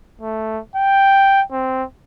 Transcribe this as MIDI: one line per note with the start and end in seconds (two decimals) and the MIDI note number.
0.21 0.60 57
0.76 1.42 79
1.52 1.84 60